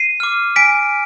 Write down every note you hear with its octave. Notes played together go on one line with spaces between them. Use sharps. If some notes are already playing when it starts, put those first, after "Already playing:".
Already playing: C7 D#7
D6 F6
G#5 B6 D7